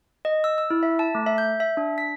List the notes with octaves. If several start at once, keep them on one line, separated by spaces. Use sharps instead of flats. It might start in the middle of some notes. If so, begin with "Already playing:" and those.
D#5
E6
E6
E4
E5
A5
A3
E5
G6
E5
D4
B6